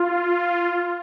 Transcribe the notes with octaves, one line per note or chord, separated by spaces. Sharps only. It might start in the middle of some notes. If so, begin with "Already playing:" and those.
Already playing: F4